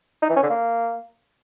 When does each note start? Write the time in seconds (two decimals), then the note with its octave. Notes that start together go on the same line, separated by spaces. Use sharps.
0.22 D#4
0.29 E3
0.36 C#4
0.43 D3
0.50 A#3